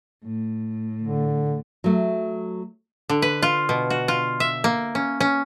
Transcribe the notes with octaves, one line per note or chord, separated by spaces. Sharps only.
A2
D3
F#3 A3
D3
B4
F4
B2
F#4
F4
E5
A#3
C#4
C#4